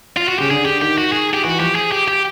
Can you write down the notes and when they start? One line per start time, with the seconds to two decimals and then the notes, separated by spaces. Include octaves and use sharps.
0.17 F4
0.28 F#4
0.39 C#3 G4
0.50 D3 G#4
0.65 D3 G4
0.82 D#3 G4
0.98 F#4
1.13 G#4
1.34 G4
1.44 E3 F#4
1.60 F3 G4
1.75 G#4
1.92 G4
2.08 G4